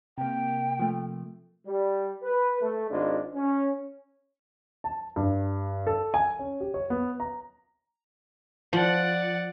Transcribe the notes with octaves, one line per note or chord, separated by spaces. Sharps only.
C3 A#3 G5
F3 A3
G3
B4
A3
G#1 G#3 D4 F4
C#4
A5
G2
A4
G#5
C#4
G4
C#5
B3
A#5
F3 D5 F#5